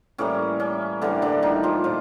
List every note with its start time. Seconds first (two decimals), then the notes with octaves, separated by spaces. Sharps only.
0.18 A2 E3 G3 A#3 C#4
0.60 C#4
1.02 A2 D3 E3 G3 A#3 D4
1.22 D3 D4
1.42 D#3 D#4
1.63 F3 F4
1.84 A#2 F3 A#3 F4